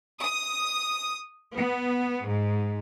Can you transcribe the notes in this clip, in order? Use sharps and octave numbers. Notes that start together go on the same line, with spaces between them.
D#6
B3
G#2